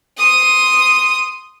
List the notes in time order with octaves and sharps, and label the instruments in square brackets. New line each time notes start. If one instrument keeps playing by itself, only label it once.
[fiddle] C6 D#6